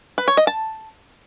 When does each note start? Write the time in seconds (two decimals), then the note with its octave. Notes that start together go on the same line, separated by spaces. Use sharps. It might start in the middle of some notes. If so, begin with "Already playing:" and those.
0.18 B4
0.28 C#5
0.37 D#5
0.47 A5